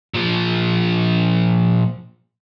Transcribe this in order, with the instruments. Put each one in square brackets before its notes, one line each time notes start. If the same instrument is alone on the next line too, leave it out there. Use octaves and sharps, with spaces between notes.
[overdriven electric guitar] A#2 F3